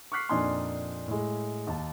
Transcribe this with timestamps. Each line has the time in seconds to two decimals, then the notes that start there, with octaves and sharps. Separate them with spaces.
0.12 C#6 D6 F6 F#6 B6 C7
0.29 F2 A#2 D4 D#4 G#5 C6
1.08 A2 G#3
1.67 D#2 A5